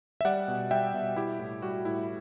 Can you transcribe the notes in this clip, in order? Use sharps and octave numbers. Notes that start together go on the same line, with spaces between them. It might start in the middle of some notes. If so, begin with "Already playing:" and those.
E5
G3 D5 F#5
B2
G3 E5 G5
B2
G3 E4 G4
A2
G3 F#4
A2 E4